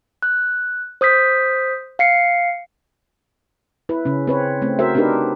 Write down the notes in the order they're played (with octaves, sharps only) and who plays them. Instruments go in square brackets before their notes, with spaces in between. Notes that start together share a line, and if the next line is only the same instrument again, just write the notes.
[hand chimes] F#6
C5 D#6 G6 B6
F5 C7 C#7
[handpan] E4 B4
C#3 C#4
C4 B4 C#5
A3 C4
F#4 A#4 C5 E5
C4 D4 D#4 G4 A#4 B4